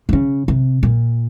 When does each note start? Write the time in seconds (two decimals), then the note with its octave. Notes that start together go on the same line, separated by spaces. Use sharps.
0.09 D#3
0.13 C#3
0.48 C3
0.83 A#2